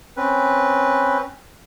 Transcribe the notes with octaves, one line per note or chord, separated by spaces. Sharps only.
C4 C#4 B4